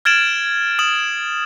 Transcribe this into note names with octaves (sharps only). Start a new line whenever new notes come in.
F6 G#6 A6 D7 E7 F#7
D#6 E7 F#7